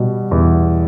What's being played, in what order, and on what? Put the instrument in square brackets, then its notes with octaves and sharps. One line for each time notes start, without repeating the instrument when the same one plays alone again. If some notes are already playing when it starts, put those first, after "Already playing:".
Already playing: [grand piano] B2 G3
E2